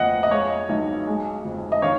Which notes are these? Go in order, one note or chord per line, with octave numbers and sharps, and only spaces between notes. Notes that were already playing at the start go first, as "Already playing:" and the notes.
Already playing: F2 A#3 D#5 F#5
D#5
G#3 C#5 F5
B1
G#3
F2
D#5
D#3 C#5 F5